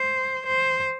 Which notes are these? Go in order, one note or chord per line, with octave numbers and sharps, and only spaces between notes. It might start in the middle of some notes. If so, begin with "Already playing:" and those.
Already playing: C5
C5